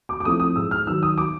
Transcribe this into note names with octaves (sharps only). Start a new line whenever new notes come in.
D6
D6
F3 A3 C4 E4 D#6
D#6
G#2 E6
F6
D#3 F#3 E6
D#6
D6